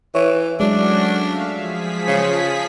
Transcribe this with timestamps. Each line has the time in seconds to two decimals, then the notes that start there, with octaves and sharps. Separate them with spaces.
0.15 E3 C#5
0.60 F#3 G#3 A3 C#4 D4 F#4
1.19 E5 F5
1.53 F3 G#4 B6
2.08 C#3